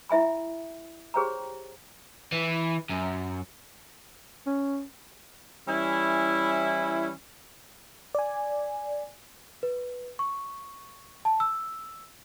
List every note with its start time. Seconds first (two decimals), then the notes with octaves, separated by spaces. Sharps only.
0.09 E4 E5 G#5 B5
1.14 G4 G#4 C5 C#5 G5 A#5
2.32 E3
2.89 F#2
4.47 C#4
5.68 E3 G3 C#4 E4
8.15 D5 G#5
9.63 B4
10.19 C#6
11.25 A5
11.40 E6